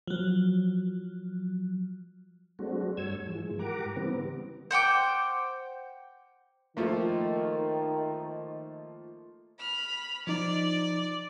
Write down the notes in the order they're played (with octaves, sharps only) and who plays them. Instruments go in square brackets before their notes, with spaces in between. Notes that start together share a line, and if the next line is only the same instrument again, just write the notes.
[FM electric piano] F3 F#3
[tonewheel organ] F#3 G#3 A3 C4 D4 F#4
G2 G3 C#5 E6 G#6
G#2 E3 F3 G#3
G#2 G4 A#4 F#5 A#5 D6
C#3 E3 G3 B3 C4
[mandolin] C5 F#5 G5 D6
[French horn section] D#3 [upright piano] F3 A3 A#3
[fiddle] B5 F6
[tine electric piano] F3 D#4 [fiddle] D5